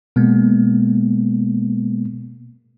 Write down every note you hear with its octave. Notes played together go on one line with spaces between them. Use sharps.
B2 G#3 A#3 B3